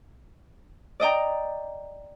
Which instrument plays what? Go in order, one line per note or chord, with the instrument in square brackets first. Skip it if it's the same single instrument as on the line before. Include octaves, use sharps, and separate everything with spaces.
[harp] D5 D#5 G5 A#5